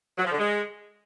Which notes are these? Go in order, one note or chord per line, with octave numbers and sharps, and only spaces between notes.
F#3
F3
D3
G#3